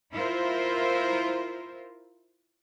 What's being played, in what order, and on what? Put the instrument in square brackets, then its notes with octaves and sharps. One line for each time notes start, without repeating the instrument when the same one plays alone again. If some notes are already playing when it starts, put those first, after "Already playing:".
[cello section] E4 F4 A#4 C5